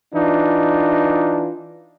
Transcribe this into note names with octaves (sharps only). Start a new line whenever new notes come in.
E3 D4 D#4 F4